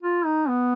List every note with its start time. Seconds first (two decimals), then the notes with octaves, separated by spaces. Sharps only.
0.03 F4
0.25 D#4
0.48 B3